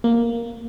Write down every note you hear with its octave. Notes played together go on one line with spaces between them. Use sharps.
A#3